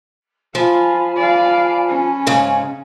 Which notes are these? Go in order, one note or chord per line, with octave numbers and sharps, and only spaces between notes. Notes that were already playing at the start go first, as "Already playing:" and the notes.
F3 F4 G#5 A5 B5
D5 F5
C#4
G#2 C#3